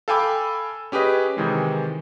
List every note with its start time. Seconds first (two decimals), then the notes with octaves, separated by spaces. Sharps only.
0.08 A4 F5 G5 G#5 B5 D6
0.92 C#4 G4 G#4 B4 D#5
1.37 C3 D#3 E3 G#3